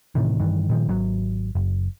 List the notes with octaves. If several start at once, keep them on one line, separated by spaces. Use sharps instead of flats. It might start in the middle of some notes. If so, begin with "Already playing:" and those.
A2 C3 D#3 E3
G2 D#3 E3
A#2 D#3 F3
G#1 D#3 F#3
F#1